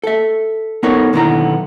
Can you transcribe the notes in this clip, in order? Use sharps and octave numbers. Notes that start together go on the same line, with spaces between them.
A4 E5
B3 D#4 A4 A#4 C#5
B1 D3 D#3 B3 E4 A#5